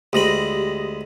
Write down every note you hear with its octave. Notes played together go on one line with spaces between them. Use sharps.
D2 G#3 G4 B5 D#6 A#6